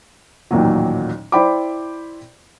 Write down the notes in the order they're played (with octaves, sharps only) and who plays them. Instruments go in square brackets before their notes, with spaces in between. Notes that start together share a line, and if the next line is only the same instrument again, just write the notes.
[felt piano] A1 D#2 A#2 F#3
E4 C5 D5 G5 B5 D6